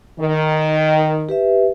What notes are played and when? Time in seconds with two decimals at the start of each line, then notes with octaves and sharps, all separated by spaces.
0.18 D#3
1.29 G4 B4 E5